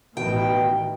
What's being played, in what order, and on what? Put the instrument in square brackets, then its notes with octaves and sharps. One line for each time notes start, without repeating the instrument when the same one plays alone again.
[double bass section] A1 D#3 E3 [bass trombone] B2 [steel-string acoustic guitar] G5